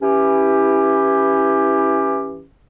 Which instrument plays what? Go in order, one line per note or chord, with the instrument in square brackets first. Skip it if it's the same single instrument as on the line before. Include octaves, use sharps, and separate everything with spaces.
[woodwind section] E3 C#4 E4 G4